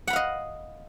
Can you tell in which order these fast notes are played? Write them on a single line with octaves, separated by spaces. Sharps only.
F#5 B5 F5 D#5